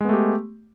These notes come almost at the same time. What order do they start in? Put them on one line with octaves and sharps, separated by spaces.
G#3 B3 A3 G4